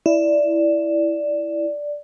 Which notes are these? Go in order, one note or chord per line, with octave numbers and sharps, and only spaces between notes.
E4 D5